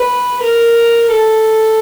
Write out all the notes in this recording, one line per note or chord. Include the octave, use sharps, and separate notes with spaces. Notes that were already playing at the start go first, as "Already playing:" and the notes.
Already playing: B4
A#4
A4